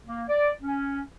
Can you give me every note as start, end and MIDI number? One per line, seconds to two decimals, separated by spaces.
0.06 0.22 58
0.28 0.50 74
0.62 1.00 61